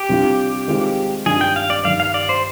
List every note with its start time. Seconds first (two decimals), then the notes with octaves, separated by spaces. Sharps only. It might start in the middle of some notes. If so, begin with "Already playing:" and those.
Already playing: G4
0.09 C3 G3 D4 F4
0.67 D#3 G#3 C4 F4
1.26 G2 D#3 G3 D4 F4 G#4
1.41 G5
1.56 F5
1.70 D5
1.85 G2 D#3 G3 F5
2.00 F5
2.14 D5
2.29 C5